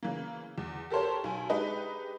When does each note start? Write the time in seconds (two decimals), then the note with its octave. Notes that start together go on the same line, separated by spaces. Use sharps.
0.03 C#3 E3 A#3
0.58 E2
0.90 G4 A4 A#4 C5 C#5
1.24 B1 G#5
1.49 G#3 D4 D#4 G4 B4 D#5